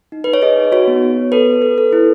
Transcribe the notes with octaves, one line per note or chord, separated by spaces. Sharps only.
D#4
D#4 B4
C#5
G#4 B4 D#5
D#4
F#4 C#5
B3
B3
B3
A4 B4
A4
A4
A4
E4